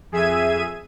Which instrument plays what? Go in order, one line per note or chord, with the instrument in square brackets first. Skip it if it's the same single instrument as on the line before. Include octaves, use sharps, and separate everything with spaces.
[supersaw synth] F2 G#4 E5 G#6 D#7